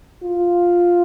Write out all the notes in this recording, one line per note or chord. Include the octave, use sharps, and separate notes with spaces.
F4